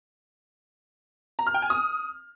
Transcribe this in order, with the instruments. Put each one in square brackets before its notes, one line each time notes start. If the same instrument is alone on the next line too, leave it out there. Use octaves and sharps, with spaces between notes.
[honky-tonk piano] A#5
F6
G5
G#5
D#6